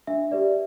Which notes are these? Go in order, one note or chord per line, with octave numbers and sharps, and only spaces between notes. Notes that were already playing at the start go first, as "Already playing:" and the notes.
D4 E5
G4 B4 D5